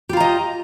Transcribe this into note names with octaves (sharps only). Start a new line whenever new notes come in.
F4 G4 D#5 A#5